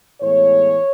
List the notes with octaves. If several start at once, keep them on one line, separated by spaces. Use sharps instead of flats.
A2 E3 G#3 B3 C#5